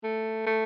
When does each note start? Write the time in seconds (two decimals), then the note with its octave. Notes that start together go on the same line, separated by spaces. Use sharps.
0.04 A3
0.46 A3